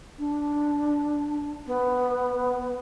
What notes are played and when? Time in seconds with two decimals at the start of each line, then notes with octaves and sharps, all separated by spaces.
0.19 D4
1.66 B3